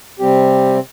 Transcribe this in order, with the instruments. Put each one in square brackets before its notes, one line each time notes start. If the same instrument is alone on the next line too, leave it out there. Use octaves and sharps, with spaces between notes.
[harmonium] C3 G3 C4 G4